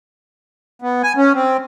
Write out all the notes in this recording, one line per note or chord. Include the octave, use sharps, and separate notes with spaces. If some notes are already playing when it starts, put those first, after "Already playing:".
B3
G#5
C#4
C4